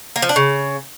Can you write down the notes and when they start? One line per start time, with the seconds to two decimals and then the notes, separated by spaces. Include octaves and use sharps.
0.16 A#3
0.22 F3
0.29 D4
0.36 C#3